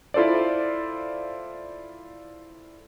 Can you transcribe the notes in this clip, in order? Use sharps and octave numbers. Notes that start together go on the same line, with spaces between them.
E4 F4 A4 C5 D5